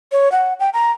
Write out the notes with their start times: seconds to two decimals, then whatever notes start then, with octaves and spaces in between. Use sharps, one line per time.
0.12 C#5
0.32 F#5
0.60 G5
0.73 A#5